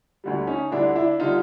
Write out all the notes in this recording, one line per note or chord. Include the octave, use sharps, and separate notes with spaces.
D2 D3 G3
C#4 D#4
D2 D3 G3 D4 E4
D4 E4
D3 G3 D#4 F4